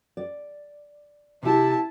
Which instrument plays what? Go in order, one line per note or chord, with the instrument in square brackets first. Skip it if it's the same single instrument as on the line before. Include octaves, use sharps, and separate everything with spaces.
[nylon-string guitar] D5
[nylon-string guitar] C3 G4 [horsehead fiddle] E4 A5